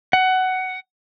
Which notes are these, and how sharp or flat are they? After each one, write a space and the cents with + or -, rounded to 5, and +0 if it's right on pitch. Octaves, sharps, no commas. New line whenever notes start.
F#5 +15